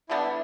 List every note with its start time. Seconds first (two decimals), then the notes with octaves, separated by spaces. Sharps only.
0.09 D3 G3 B3 D4 E4
0.24 E4